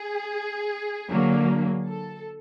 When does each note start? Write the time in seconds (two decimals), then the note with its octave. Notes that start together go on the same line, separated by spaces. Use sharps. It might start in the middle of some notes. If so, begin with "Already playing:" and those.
Already playing: G#4
1.09 D3 F#3 A#3
1.87 A4